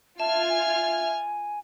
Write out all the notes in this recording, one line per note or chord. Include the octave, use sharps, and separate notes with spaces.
F4 E5 A5 F6 G#6
G#5